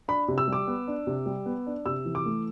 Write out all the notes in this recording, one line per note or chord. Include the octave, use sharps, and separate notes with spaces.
D4 B5
C3
E6
G3 D6
B3
D4
C3
G3
B3
D4
C3 E6
E3
D6
A3